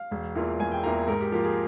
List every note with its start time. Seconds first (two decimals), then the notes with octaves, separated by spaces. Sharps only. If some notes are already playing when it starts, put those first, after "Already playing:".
Already playing: F5
0.11 E1
0.35 E2 E3 A#3 F4
0.60 E1 G#5
0.72 G5
0.83 E2 E3 A#3 F4 A#5
1.08 G#2 A#4
1.21 G4
1.32 F3 A#3 F4 G4
1.45 G#4